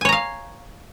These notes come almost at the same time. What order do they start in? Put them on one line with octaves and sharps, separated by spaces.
G#5 C#5 A#5 F5